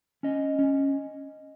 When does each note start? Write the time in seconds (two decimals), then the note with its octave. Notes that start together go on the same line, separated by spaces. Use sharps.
0.23 C#4 D#5
0.59 C#4